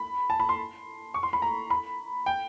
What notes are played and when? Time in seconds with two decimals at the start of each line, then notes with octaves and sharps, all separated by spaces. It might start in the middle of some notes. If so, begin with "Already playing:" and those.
Already playing: B5
0.30 A5
0.40 B5
0.49 C6
1.14 C#6
1.23 C6
1.33 B5
1.42 A#5
1.70 B5
2.26 G5